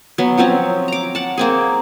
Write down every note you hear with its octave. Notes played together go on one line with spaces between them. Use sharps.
F#3 B3
F3 F#3 C4 C#4
A#5 D6
F#5 A5
A#3 C4 G#4